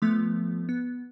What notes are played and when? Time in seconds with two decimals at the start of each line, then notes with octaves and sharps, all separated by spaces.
0.02 F3 A3 B3
0.69 B3